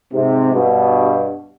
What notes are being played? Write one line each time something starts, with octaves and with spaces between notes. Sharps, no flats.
G#2 C3
G2 B2